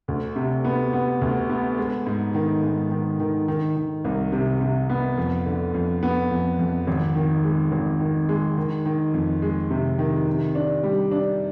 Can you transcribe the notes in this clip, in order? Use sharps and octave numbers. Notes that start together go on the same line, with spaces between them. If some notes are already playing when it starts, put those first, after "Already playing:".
D2
C3
B3
B3
D2
B3
G#3
G#2
D#3
G#2
D#3
D#3
D#3
D#3
C2
C3
C3
B3
F2
D3
F2
B3
F2
F2
G#1
D#3
G#3
G#1
D#3
G#3
D#3
D#3
F2
G#3
C3
D#3
C3
D4
G3
D4